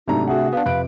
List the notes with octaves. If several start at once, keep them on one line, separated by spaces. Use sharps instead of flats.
G#2 C3 F#3 A3 D4 D#4 A#5
F#4 G#4 E5 F#5
B3 D4 F5
F2 C3 B4 D7